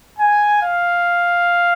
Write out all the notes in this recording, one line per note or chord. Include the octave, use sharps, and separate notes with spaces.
G#5
F5